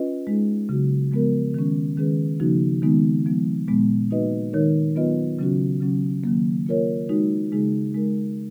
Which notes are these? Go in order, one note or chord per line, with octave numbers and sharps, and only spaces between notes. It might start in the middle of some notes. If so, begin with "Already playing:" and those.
Already playing: C#4 F4 B4 D#5
G#3 D#4 G#4
C#3 F#3 B3 F#4
F3 G#3 B3 F#4 A#4
D#3 G#3 C#4
D#3 G#3 C#4 G#4 B4
C#3 F3 A#3 D#4 F#4
D#3 G#3 B3 D#4
F3 G#3 B3
A#2 G#3 B3
A#3 D#4 F#4 B4 D#5
D#3 G#3 D#4 A#4 C#5
F#3 B3 F4 B4 D#5
C#3 F#3 C#4 F#4
C#3 F#3 C#4
D#3 F#3 A#3
A#3 F4 A#4 C#5
G#3 D#4 F#4
C#3 G#3 D#4 G#4
G#3 D#4 A#4